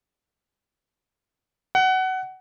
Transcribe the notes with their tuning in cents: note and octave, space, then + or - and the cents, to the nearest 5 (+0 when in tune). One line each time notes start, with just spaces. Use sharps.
F#5 +20